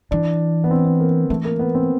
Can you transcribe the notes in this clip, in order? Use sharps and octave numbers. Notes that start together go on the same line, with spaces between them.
E3 D4
B3
C4
B3
A#3
E3 A3
A#3
B3
C4